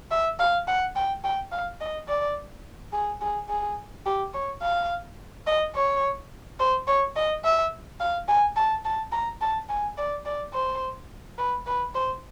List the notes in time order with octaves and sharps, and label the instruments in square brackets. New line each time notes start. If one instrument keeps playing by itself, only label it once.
[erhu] E5
F5
F#5
G5
G5
F5
D#5
D5
G#4
G#4
G#4
G4
C#5
F5
D#5
C#5
C5
C#5
D#5
E5
F5
G#5
A5
A5
A#5
A5
G#5
D5
D5
C5
B4
B4
C5